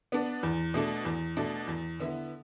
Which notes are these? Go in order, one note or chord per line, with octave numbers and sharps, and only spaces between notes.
B3 D4
E2
B2 A3 D4
E2
B2 A3 D4
E2
D3 B3 E4